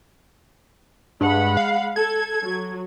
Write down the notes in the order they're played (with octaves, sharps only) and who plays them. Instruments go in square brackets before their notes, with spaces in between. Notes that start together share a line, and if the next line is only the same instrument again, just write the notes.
[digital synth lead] G2 [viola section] G#3 F#5 B5
[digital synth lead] F5
[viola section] A4 [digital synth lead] G#6
[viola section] F#3